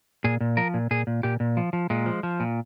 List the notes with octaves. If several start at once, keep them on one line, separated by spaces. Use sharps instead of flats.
A#2 G#4
A#2
F3 A#4
A#2
A#2 G#4
A#2
A#2 G4
A#2
F3
F3
A#2 G#3
F3
F3
A#2